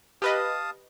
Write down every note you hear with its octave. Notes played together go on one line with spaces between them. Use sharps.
G4 B4 D#5 F5 A5 D#6